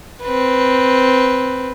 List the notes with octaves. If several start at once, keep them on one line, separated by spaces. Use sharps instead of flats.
C4 B4